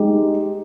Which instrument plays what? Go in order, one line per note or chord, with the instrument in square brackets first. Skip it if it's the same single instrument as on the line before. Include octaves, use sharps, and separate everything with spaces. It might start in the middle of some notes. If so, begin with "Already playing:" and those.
Already playing: [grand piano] G#3 D#4 G4